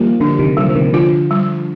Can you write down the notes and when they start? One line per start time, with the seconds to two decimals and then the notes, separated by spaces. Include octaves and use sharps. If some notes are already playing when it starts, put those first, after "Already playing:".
Already playing: D#3 F3 G3 A#3 F4
0.20 D3 F3 D4
0.39 C3 D#3
0.57 D3 F3 G3
0.69 F3
0.75 C3 D#3
0.93 D3 F3 F4
1.31 G3